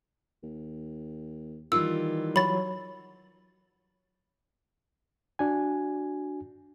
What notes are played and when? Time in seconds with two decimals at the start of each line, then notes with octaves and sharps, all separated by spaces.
0.43 D#2
1.72 D#3 E3 G3 F4 E6
2.36 F#3 C#5 B5 A6
5.39 D4 F#4 G#5